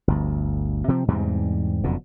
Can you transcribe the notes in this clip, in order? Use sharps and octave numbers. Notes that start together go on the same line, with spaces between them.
G1 D2
C3 F3 C4
E2 G#2 C3 G3
F#1 F2 B2 D3